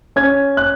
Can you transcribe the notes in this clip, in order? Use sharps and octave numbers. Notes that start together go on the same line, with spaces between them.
C#4 G#6
F#6